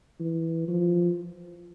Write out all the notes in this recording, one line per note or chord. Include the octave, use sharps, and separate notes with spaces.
E3
F3